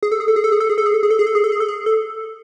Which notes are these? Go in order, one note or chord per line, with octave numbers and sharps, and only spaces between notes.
G#4
A4
G#4
A4
G#4
A4
G#4
A4
G#4
A4
G#4
A4
G#4
A4
G#4
A4
G#4
A4
G#4
A4
G#4
A4